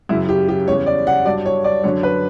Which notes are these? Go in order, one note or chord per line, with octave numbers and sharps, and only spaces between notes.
F#2 C#3 F#3 E4
G4
G4
E2 C#3 G3 C#5
D5
F#5
G2 F#3 D5
C#5
D5
F#2 D3 F#3 C#5
B4